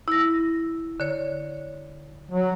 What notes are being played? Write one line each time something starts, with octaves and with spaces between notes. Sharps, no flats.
E4 A#6
D3 C#5
F#3